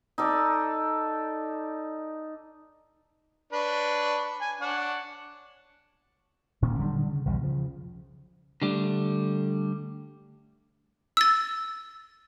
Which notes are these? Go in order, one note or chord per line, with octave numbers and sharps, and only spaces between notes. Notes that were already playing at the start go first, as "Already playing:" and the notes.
D#4 A4 D5
D4 B4 C#5
G#5
D4 C#5 F#5
D#1 A#2 D#3 C#4
D3 D#3 F#3 G3
C#3
B1 E2 G3
C#3 F3
D3 G3 A3
E6 A6